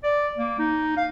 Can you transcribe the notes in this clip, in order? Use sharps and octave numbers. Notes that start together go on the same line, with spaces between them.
D5
A#3
D#4
F5